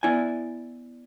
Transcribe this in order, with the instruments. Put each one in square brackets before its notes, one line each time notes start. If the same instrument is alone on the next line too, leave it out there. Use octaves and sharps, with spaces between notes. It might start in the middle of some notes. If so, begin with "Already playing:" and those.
[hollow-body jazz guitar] B3 E4 D5 G#5